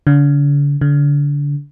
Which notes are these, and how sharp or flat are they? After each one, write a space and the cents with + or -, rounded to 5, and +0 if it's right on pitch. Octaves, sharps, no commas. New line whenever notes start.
D3 -40
D3 -30